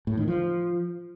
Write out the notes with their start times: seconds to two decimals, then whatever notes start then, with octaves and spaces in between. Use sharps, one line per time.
0.07 A2
0.17 D#3
0.28 F3